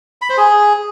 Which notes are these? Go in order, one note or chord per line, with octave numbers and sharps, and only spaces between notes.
B5
C5
G#4